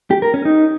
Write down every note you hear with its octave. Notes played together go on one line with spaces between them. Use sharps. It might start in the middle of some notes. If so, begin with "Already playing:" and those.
G4
A#4
C#4
D#4